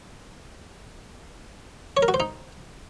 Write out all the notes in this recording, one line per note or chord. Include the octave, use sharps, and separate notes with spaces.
C#5
A#4
F#4
C5
D#4